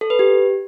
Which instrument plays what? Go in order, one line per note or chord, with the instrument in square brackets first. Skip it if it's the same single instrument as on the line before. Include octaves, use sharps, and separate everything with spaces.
[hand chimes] A4
B4
G4